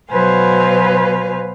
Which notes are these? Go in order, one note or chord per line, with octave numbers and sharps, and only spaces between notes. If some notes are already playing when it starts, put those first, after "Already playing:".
B2 F#3 B4 C5 F5 G#5